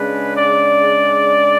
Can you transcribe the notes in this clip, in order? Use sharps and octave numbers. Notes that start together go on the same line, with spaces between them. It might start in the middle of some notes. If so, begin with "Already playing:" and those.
Already playing: C#3 G#3 D4 B4
D5